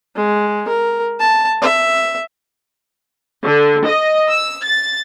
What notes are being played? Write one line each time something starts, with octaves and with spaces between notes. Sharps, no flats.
G#3
A#4
A5
E5
D3
D#5
E6
A6